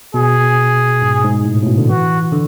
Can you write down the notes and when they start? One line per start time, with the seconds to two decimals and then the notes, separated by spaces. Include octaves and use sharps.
0.14 B2 G#4
1.02 G#2
1.24 G#2
1.45 A2
1.62 A2
1.67 B2
1.78 D3
1.89 E3 F#4
2.32 D3